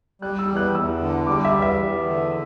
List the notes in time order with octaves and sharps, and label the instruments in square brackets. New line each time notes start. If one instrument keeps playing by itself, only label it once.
[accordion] G3 [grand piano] F#6
[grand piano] E6
[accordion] E2
[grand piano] F#6
[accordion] E2 [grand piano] E6
[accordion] D3
[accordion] G3 [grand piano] D6
[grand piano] E5
[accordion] E2
[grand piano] E5
[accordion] E2
D3